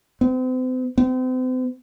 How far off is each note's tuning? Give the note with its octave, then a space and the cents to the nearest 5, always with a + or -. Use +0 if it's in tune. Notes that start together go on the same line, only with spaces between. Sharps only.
C4 -40
C4 -40